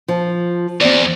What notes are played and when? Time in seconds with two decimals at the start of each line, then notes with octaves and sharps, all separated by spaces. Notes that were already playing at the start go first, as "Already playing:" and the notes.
0.08 F3
0.81 E2 C4 D5